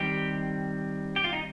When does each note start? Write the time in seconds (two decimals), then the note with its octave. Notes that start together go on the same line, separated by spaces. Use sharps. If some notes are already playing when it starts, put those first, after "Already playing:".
Already playing: D#3 G3 C4 G4
1.16 G4
1.24 F4
1.33 D#4